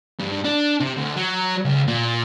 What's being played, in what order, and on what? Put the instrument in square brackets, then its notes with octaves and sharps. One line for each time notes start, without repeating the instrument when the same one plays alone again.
[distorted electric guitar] G2
D4
C3
D2
F#3
C#2
A#2